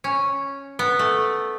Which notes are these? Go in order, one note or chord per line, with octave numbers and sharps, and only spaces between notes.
C#4
B3
A3